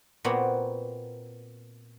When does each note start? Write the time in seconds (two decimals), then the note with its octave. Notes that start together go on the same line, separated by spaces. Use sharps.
0.24 A#2 B3 C4 F#4 B5